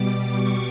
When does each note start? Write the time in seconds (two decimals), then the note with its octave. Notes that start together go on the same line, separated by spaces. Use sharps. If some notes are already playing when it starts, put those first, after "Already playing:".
Already playing: B2 G3 D6
0.33 C#6